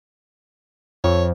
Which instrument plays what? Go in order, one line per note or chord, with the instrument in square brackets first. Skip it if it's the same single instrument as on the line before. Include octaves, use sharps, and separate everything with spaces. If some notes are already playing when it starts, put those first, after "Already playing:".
[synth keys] F2 [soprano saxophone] C#5